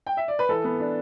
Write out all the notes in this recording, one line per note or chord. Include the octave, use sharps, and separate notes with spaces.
G5
E5
D5
B4
E3 A4
B3
D4